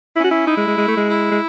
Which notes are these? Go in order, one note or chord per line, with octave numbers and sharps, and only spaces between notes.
C#4 E4
F#4
E4
D#4 E4
G#3
G#3
G#3
A3
G#3
E4
G#3